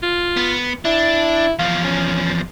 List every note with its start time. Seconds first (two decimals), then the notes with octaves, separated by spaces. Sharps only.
0.02 F4
0.37 B3
0.85 D4 E4
1.59 E2 F3 F5
1.84 C#4